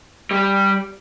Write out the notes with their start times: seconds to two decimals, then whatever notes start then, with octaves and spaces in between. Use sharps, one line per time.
0.31 G3